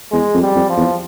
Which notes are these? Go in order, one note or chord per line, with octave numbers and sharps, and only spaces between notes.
E2 G#3
F2
G3
F2
F3
E2